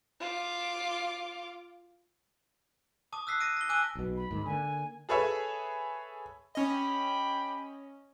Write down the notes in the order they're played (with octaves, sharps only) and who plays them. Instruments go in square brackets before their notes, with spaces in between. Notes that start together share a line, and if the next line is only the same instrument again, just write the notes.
[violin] F4 D6
[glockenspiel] A5 D6 D#6
E6 F#6 B6 C7
A#6 D7 D#7
A#6 G7
G#5 D6 E6 F#6 D#7
[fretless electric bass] B1 B2
[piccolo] B5
[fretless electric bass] G#2 D#3
[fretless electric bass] D3 A#3 [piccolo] G#5
[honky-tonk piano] G#4 A4 B4 C#5 E5 G#5
[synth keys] C#4 D#5 [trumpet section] G4 G5 B5